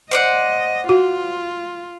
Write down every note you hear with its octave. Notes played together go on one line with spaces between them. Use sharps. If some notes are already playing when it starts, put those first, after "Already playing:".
C5 D5 D#5 F#5
F4 F#4